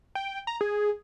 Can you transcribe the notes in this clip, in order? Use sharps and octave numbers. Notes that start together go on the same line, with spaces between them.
G5
A#5
G#4